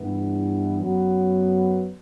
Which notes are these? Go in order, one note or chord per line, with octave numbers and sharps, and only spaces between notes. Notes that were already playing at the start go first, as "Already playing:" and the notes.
Already playing: G2 E3 B3
F#2 F#3 B3